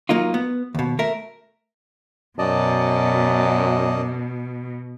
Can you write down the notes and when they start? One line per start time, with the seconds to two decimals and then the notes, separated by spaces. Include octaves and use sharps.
0.09 F#3 A#3 D#4 F4
0.34 B3
0.75 D#2 B2
0.99 A3 A#4 E5
2.39 F#2 B2 D5 D#5 A5